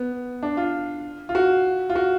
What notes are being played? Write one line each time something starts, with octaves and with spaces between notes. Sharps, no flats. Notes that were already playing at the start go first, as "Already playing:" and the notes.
Already playing: B3
D4
F4
F4
F#4
F4
F#4